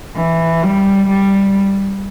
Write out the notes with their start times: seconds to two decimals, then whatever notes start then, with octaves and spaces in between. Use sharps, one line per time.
0.16 E3
0.63 G3
1.09 G3